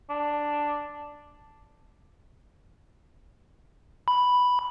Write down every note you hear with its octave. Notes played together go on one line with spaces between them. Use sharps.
D4
B5